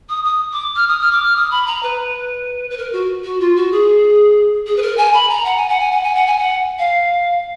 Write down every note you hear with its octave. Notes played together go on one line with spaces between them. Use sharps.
D#6
D#6
D6
F6
D#6
F6
D6
F6
D#6
B5
A#5
B4
B4
A#4
F#4
F#4
F4
F#4
G#4
G#4
B4
A#4
G#5
B5
A#5
F#5
G#5
F#5
G#5
F#5
G#5
F#5
G#5
F#5
F5